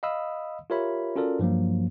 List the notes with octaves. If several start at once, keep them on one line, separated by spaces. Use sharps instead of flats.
D#5 F5 B5 D#6 E6
F4 G4 A#4 C#5 E5 B5
C#4 F4 F#4 A4 A#4 D5
G2 F3 F#3 A#3